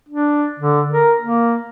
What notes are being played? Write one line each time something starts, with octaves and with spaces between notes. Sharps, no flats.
D4
D3
A#4
A#3